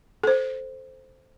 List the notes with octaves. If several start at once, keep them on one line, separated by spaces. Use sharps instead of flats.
A4 C5